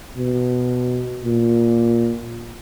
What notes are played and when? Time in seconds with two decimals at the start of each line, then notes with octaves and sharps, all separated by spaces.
0.17 B2
1.24 A#2